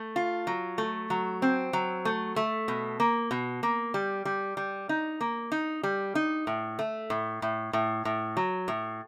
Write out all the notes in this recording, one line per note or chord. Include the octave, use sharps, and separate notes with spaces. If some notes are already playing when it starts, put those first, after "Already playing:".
Already playing: A3
F4
F#3
A3
F#3
C4
F#3
A3
A3
B2
A#3
B2
A#3
G3
G3
G3
D#4
A#3
D#4
G3
D#4
A2
A3
A2
A2
A2
A2
F#3
A2